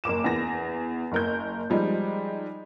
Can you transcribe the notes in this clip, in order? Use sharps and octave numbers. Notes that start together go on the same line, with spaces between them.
F#1 A#3 D6 E7
E2 A#6
F#1 A#4 G6
F3 G3 G#3 D#4